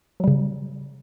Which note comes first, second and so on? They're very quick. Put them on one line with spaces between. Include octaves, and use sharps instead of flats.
F#3 G3 C#3